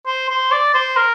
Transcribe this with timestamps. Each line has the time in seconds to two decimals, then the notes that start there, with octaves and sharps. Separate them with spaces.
0.07 C5
0.29 C5
0.51 D5
0.74 C5
0.96 A#4